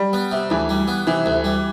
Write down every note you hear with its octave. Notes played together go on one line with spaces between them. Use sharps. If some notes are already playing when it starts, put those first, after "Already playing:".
Already playing: G3
B3
C3
D2 E3
G3
B3
C3 E3
D2
G3